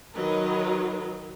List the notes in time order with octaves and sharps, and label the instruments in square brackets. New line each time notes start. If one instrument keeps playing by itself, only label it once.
[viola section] D#3 F#3 A#4 B4 D#5